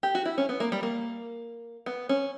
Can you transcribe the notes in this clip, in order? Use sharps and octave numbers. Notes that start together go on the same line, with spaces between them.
G4
F#4
E4
C#4
B3
A#3
G3
A#3
B3
C#4